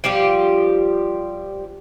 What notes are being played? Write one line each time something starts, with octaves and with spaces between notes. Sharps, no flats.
F3 G3 F4 G4